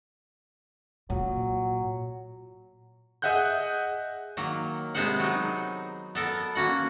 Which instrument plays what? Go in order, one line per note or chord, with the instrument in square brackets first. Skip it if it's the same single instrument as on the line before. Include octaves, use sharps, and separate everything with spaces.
[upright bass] A#2 [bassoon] F#3
[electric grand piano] G#4 D#5 E5 F#5 F#6 G6
[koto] D#3 F#3 A#3
C3 G#3 B3 C5 F#5
F#3 D#4
B3 A4 A#4
A#3 C#4 F#4 F#5